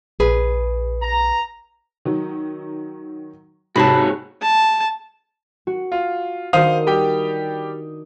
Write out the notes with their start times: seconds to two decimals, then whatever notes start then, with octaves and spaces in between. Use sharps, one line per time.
0.20 A#1 G#4 B4
1.03 A#5
2.05 D#3 F#3
3.76 G#2 C3 F#4 G#4 C#5 A5 B5
4.42 A5
5.67 F#4
5.92 F4
6.53 D#3 D4 F#4 C5 F5 D#6
6.87 G3 G4 G5